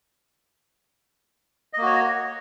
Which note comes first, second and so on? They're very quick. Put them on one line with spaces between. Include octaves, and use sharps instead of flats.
D#5 A#3 F#4 C#5